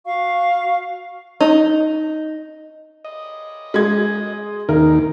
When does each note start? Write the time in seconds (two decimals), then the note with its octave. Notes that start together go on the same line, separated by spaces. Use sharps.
0.06 F#4 F5 C#6
1.41 D#4
3.05 D#5
3.74 G#3 G#6
4.69 D#2 D#3 D#4 A#4